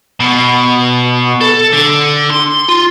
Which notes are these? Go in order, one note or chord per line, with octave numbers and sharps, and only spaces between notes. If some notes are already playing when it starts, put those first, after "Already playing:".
B2
A4
D3
C6
F4